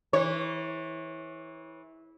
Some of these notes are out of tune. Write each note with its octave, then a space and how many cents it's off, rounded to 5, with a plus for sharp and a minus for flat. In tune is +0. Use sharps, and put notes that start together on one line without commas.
E3 -20 C#5 -30